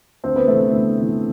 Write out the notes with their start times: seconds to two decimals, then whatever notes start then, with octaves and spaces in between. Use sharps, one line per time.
0.24 D2 C4 C5
0.36 B3 B4
0.48 C3 E3 A3 A4
0.73 D2
0.97 C3 E3